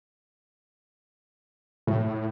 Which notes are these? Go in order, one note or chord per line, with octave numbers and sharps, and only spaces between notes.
A2